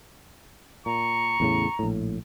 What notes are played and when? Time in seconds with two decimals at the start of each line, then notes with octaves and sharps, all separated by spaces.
0.86 A#2 A#5 C#6
1.40 E2 A2 C#3
1.79 A#1 A2